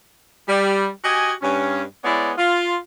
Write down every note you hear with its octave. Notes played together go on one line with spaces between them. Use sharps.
G3
F#4 G4 D#5 G#5
G2 C#4
G#3 B3 E4 C#5 D5
F4